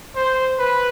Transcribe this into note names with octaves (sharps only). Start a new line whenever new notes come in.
C5
B4